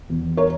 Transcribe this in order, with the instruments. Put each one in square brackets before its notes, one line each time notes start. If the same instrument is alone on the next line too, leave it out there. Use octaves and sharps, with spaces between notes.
[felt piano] E2
A#4 C#5